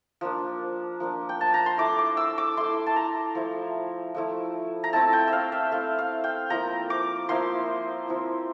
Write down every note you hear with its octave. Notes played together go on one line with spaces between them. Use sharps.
F3 A#3 D4
F3 A#3 D4
G5
A5
A#5
C6
A3 E4 D6
D6
E6
D6
A3 E4 C6
A5
A#5
F3 A3 E4
F3 A3 E4
A#5
A3 C4 E4 A5
G5
E5 F5
E5
A3 C4 E4 F5
F5
G5
F3 A#3 E4 A#5
D6
F3 A#3 E4 C6
F3 C4 E4